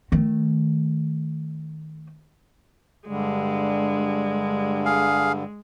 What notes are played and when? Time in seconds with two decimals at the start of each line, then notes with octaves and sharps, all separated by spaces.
0.12 D#3 A3
3.07 G2 D3 G3 G#3
4.86 G#4 F5